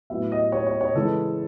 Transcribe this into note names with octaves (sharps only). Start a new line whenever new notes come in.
A2 F#3 B3 E5
D#5
C#5
C#5
C#5
C#3 E3 G#3 A4